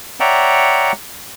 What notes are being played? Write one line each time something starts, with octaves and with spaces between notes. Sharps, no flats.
C#5 D5 E5 F#5 G5 A#5